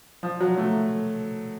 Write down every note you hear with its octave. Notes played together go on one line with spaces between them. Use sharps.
F3
F#3
A3